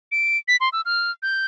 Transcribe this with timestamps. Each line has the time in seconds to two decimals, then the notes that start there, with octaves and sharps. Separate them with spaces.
0.12 D7
0.48 B6
0.61 C6
0.73 E6
0.85 F6
1.23 G6